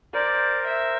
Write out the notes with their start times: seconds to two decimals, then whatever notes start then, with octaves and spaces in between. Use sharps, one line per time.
0.13 A#4 C5 D5
0.67 E5